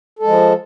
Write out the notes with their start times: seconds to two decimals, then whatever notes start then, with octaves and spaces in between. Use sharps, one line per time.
0.19 A4
0.23 G#3
0.27 F3